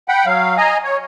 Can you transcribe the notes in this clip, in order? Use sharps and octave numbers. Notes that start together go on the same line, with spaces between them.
F#5 G5 B5
F#3 F5
D#5 G#5 A#5
C#5